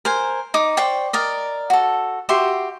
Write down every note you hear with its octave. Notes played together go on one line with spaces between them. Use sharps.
A#4 C5 G#5
D#4 D6
C5 D5 G5 C#6
A#4 D5 D#5
F#4 A4
F#4 G4 E5 C6